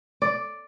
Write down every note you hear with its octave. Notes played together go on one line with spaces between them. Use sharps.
D5